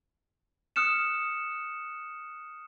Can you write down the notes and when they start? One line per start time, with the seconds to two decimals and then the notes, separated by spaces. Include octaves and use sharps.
0.76 D#6 F6 F#6 C#7 E7